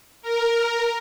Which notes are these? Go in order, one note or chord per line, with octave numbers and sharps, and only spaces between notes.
A#4